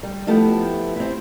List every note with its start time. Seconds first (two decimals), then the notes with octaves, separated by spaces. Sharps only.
0.03 G3
0.27 F3 A3 B3 E4 G4
0.96 C4 E4